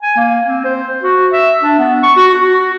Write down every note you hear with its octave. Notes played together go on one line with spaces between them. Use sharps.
G#5
A#3
C4
C5
F#4
E5
D4
B3
C#6
F#4
F#4